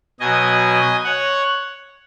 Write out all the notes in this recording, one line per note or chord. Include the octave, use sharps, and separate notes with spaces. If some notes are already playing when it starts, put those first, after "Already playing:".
B2 F#3 D#5 G#5
C#5 F#5